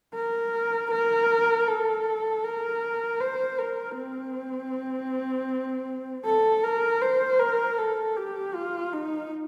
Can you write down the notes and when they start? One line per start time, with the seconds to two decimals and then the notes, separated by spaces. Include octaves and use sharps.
0.15 A#4
0.91 A#4
1.68 A4
2.44 A#4
3.20 C5
3.59 A#4
3.96 C4
6.26 A4
6.63 A#4
7.02 C5
7.39 A#4
7.78 A4
8.16 G4
8.54 F4
8.93 D#4